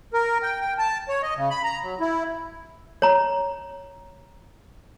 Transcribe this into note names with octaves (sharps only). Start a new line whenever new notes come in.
A#4
G5
G5
A5
C#5
D#5
C#3
B5
A#5
F#3
E4
C#5 A#5